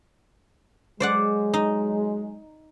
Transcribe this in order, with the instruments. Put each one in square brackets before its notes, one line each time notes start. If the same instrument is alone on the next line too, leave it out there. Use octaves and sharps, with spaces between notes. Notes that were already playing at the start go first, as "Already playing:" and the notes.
[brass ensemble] F#3 G#3 [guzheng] C5 D5 F#5
[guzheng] D#4